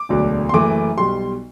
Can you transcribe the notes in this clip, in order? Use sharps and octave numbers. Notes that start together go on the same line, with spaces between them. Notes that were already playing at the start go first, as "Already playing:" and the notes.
Already playing: D6
E1 D2 D3 F#3
C6
F#1 F#2 E3 A3 D6
B1 B2 G3 C6